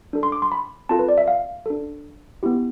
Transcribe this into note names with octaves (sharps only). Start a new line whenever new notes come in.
D4 A4
C6
D6
C6
B5
C4 F4 A4 A5
B4
D5
E5
F5
D4 A4
B3 E4 G4